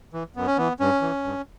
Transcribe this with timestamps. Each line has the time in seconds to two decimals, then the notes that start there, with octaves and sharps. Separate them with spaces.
0.13 E3
0.36 F#2 B3
0.47 C#4
0.57 E3 B3
0.80 G2 C#4
1.02 E3
1.24 G2